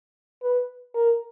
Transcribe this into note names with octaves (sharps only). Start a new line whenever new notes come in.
B4
A#4